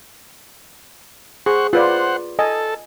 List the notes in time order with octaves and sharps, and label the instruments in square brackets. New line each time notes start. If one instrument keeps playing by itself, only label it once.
[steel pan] G#4 [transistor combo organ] C5 F#5 C#6
[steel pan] F4 B4 D5 [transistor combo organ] C5 F#5
[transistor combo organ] A4 [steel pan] D#5 G#5